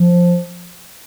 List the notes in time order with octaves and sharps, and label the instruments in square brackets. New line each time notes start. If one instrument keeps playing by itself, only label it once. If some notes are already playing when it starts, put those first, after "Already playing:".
Already playing: [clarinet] F3